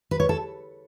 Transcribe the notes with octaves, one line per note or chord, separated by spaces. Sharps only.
B4
C#5
A4